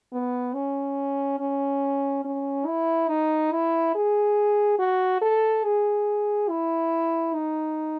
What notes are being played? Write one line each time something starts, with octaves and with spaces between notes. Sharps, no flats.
B3
C#4
C#4
C#4
E4
D#4
E4
G#4
F#4
A4
G#4
E4
D#4